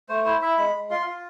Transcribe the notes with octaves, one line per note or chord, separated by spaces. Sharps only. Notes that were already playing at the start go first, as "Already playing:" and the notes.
A3 C5
E4 C5
E4 E5
G#3 B5
G#3
F4 C6
F4